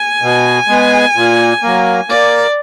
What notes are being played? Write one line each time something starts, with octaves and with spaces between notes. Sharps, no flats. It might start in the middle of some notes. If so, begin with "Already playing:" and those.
Already playing: G#5
B2
G#3 B3
A#2
F#3 A#3
A#3 D5